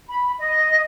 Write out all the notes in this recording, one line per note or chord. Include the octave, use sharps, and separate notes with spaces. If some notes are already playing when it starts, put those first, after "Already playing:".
B5
D#5